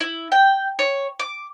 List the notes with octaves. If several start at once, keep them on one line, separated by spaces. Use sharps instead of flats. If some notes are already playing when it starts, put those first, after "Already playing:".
E4
G5
C#5
D6